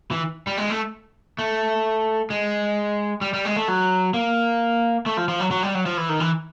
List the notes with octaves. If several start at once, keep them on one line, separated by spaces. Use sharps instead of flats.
E3
G3
G#3
A3
A3
G#3
G3
G3
G#3
A3
F#3
A#3
A3
F3
F3
F#3
F#3
G3
F#3
F3
E3
D#3
E3